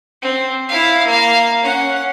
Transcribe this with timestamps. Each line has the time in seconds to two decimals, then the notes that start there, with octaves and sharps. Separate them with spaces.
0.22 C4
0.69 E4 F5
1.05 A#3 F5
1.62 C#4 F#5